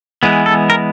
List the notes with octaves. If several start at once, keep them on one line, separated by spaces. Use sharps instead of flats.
E3 G#3 B3
A4
A#4